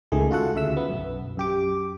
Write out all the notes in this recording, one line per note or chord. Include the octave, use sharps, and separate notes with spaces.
C#2 D#3 A3 G#4
F4 F#4 A4 F#5
D2 C#3 E5 E6
B3
B1 F#2
F#2 G4 D6